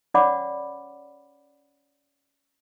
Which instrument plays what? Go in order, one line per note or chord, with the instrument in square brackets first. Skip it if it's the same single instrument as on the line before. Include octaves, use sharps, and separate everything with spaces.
[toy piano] C#4 C#5 D5 F#5 B5 D6